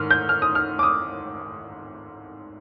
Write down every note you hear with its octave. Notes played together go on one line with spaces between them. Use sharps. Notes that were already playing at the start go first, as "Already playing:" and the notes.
Already playing: G#2 D#3 F6
G6
F6
D#6
F6
D6
D#6